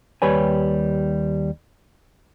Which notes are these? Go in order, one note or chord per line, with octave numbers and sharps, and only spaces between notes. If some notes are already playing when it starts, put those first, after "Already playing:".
D#2 G3 B4 C#5 G#5